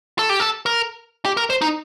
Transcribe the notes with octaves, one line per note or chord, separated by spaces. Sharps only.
A4
G4
A4
A#4
G4
A#4
C5
D#4